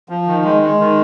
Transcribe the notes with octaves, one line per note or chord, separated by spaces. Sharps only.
F3
D#3
G#3
G#3
D#3